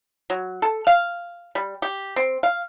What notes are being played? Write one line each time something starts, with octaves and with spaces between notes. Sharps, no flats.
F#3
A4
F5
G3
G4
C4
F5